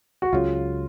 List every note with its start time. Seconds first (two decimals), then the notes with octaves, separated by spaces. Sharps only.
0.22 F#4
0.33 C#2 C#3 F#3 F4